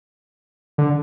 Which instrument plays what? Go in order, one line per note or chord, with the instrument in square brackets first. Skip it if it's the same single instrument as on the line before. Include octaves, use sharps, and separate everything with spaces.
[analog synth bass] D3